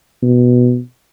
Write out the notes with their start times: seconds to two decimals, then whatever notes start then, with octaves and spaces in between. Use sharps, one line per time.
0.23 B2